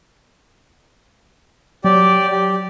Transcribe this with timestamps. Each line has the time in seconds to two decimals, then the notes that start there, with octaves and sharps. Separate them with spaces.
1.84 F#3 G4 D5
2.32 G4